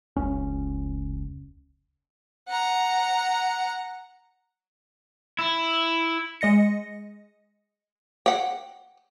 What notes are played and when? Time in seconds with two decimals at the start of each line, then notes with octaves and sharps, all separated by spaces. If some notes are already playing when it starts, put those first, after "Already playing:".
0.17 F1 C#2 C#4
2.49 F#5 A#5
5.39 E4
6.41 G#3 D#5 A#6 C#7
8.26 F#5 G5